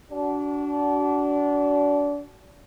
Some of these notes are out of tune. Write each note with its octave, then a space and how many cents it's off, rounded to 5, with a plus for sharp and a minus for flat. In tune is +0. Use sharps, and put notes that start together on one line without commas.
D4 -25 F#4 +25